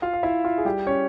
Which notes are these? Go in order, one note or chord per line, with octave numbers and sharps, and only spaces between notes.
F4 F5
F5
E4 E5
F4
G#4
G3 G4
C#4 C#5